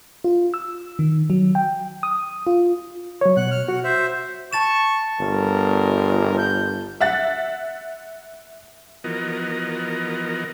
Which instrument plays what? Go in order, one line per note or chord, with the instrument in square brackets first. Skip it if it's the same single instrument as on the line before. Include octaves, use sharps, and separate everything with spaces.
[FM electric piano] F4
E6
D#3
F#3
G5
D#6
F4
[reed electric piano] F#3 C#5
[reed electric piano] B2 [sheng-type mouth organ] F#5 F#6
[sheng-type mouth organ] F6
[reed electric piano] F#4 [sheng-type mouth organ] F#5
[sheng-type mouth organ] C5 E5
[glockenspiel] A5 A6 E7 [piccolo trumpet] C#6
[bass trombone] G1 [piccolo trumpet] A#4
[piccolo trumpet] G6
[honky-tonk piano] E5 F#5 A6
[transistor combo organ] E3 F3 B3 F#4 A#4 D#5